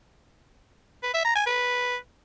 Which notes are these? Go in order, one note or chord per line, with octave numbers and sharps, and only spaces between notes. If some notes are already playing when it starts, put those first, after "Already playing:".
B4
E5
A#5
G#5
B4